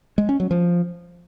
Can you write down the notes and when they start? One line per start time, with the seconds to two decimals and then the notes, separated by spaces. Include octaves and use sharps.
0.18 G#3
0.29 C#4
0.40 F#3
0.51 F3